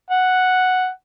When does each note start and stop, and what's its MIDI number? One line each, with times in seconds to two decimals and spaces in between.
0.10 0.89 78